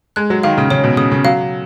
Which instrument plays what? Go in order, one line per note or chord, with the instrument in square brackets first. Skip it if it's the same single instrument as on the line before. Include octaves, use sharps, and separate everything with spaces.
[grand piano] G#3 [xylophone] F#6
[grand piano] F#3
[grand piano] D#3 [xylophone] F5
[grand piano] C#3
[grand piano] C#3 [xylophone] C#5
[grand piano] B2
[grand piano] C#3 [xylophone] D#6
[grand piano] C#3
[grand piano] F#3 [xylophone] F5